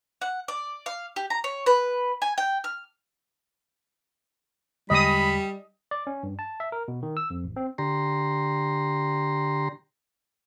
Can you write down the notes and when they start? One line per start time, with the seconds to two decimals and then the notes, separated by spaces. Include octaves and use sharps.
0.21 F#5
0.48 D5
0.86 F5
1.16 G4
1.30 A#5
1.44 C#5
1.66 B4
2.22 G#5
2.38 G5
2.64 F6
4.90 E2 D3 G3 G#3 D#5 B5 D#6
5.91 D5
6.07 C#4
6.23 G2
6.39 A5
6.60 E5
6.72 A#4
6.88 B2
7.03 D#3
7.17 E6
7.30 F2
7.44 A1
7.56 C4
7.78 D3 G4 A#5 C6